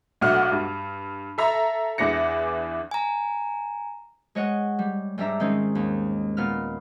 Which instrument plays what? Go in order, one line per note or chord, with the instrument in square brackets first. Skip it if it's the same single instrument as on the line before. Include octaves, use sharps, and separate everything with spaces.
[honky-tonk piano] B1 A3 D4 F#4 F#5 F6
G2
A4 E5 A#5
E2 E3 D4 A#6 C#7
[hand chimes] G#5 A#5
[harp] G#3 C#5 D#5 F#5
G3
G#2 G3 D4 E5 A#5
D#3 G#3 C4 C#4 D#4
D#2
A#2 B3 F6